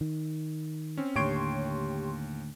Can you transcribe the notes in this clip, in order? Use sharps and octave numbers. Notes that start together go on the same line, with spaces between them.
D#3
C4 C#4
D#2 A2 D3 G4 C#5 C6 D7